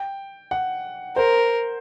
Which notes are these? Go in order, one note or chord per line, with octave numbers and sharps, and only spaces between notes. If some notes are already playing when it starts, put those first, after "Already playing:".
Already playing: G5
F#5
A#4 C5